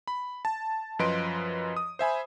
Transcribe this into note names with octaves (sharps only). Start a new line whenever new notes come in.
B5
A5
F#2 F3 B4 D#5 C6 D7
D#6
C5 E5 G#5 B5